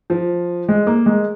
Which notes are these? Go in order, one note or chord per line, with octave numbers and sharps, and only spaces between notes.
F3
G#3
A#3
G#3